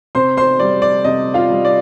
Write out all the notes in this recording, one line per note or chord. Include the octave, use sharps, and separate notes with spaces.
C3 C5 C6
C5 C6
G3 D5
D5
C3 D#5
F4 F5
G3
D5